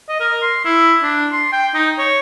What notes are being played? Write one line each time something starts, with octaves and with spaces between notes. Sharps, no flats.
D#5
A#4
C6
E4
D4
C6
G5
D#4
C#5